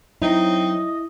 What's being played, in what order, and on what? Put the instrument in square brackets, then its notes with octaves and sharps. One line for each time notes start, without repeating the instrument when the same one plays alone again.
[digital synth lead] F#3 [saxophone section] C4 D#4 [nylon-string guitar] E4 [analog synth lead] D#5